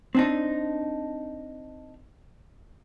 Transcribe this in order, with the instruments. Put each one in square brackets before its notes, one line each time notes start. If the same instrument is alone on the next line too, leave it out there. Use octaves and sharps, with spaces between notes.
[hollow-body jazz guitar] C4 D4 D#4